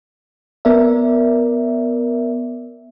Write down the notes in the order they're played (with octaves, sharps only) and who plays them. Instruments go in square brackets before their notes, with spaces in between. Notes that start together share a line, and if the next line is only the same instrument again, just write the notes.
[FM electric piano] B3 A#4 D5 E5